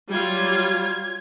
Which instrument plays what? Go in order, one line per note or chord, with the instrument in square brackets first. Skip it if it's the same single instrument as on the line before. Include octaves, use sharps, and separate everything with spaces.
[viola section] F#3 G3 F4 [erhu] G#6